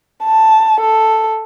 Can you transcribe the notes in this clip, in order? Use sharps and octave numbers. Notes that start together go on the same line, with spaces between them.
A5
A4